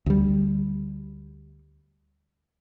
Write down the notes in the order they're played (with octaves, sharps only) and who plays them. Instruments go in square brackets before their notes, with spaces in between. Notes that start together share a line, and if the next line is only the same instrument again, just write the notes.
[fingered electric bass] D2 G3